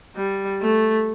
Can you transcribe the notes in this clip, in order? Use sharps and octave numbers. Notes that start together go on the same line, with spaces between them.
G3
A3